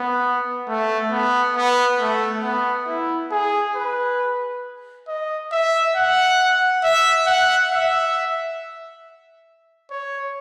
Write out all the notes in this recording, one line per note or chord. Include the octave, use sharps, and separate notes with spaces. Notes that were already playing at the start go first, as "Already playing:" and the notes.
Already playing: B3
A3
B3
B3
A3
B3
E4
G#4
B4
D#5
E5
F#5
E5
F#5
E5
C#5